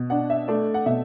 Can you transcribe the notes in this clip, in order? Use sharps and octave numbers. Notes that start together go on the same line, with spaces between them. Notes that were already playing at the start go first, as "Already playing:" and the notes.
Already playing: B2
D4 F#5
E5
A3 D5
F#5
B2 E5